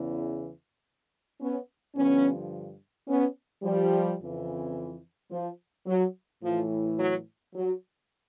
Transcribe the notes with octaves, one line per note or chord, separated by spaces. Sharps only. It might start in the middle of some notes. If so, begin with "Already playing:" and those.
Already playing: E2 C#3 E3
B3 C#4
G2 D3 F3 B3 C#4
B3 C#4
F3 G3
F2 C#3 E3
F3
F#3
A2 E3 F3
F#3
F#3